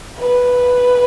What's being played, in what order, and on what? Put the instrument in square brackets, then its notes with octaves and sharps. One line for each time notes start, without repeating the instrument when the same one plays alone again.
[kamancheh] B4